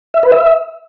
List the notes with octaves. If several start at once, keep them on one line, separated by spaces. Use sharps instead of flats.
E5
B4
E5